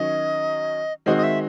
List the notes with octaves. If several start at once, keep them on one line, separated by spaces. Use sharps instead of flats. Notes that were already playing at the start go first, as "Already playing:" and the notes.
Already playing: D#3 F#3 C#4 D#5
D#3 G#3 C4 F#4 D#5
D#5
E5